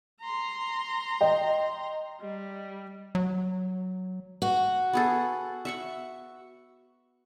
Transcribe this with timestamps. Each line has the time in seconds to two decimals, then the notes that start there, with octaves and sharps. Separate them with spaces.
0.21 A#5 C6
1.21 D#5 G5
2.21 G3
3.15 F#3
4.42 F#4
4.93 B3 G#4 A4
5.65 E5 F#5 C#6